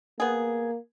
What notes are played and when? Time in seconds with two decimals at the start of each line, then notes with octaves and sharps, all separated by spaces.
0.20 A#3 B3 G#4